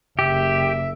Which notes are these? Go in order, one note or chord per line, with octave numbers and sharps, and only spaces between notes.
F#1 G4 E5